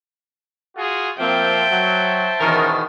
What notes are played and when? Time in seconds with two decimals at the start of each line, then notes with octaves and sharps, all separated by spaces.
0.76 F4 F#4 G#4
1.20 F3 A#3 C4 C5 E5 G5 A5
1.71 F#3
2.40 E2 B2 D#3 C#4 D#4 A#4